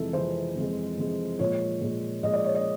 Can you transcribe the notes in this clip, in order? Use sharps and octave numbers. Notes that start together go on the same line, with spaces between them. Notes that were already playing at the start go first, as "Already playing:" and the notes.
Already playing: F2 C3 E3 G#3 A4
F2 C3 E3 G#3 C5
F2 C3 E3 G#3
F2 C3 E3 G#3
A#2 F3 G#3 C#5
A#2 F3 G#3
A#2 F3 G#3 D#5
D5
C#5
D#5